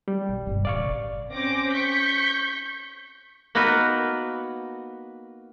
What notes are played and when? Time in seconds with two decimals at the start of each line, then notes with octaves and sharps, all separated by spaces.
0.08 G3
0.29 B1
0.47 G1 C3
0.65 A2 C#3 D5 F5 C#6
1.32 C4 C#4 C5 D6 A#6
1.73 C#6 G6 B6
3.55 A#3 B3 D#4 F#4 A#4 B4